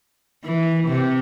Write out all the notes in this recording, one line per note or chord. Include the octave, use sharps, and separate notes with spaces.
E3
C3